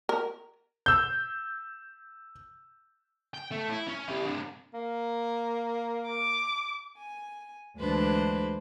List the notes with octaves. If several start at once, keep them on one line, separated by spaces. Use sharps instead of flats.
A#4
E6 G6
G5
A3
E4
C#4
E4 G4
C3 D4
A#3
D6
G#5
D2 G#2 E3 D4 B4 C5